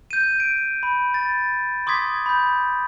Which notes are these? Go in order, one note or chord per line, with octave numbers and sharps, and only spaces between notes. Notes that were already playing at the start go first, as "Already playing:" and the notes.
G6 D#7
D7
B5
A6
C6 D6 D#6 G#6 B6
B5 G6